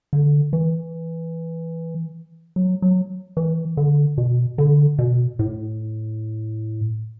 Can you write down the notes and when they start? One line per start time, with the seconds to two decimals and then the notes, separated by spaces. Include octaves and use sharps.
0.13 D3
0.53 E3
2.56 F#3
2.82 F#3
3.37 E3
3.77 D3
4.18 B2
4.58 D3
4.99 B2
5.39 A2